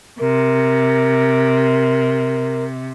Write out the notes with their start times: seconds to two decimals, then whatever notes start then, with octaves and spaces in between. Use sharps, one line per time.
0.19 C3 A#4